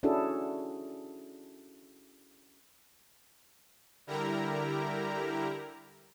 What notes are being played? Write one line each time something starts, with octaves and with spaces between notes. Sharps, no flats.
C#4 D4 E4 F#4 G#4 A4
D3 G3 E4 G4 A#4 A#5